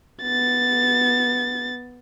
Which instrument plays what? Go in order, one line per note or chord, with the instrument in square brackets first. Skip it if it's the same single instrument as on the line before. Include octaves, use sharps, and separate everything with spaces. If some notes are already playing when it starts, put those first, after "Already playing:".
[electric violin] B3 A6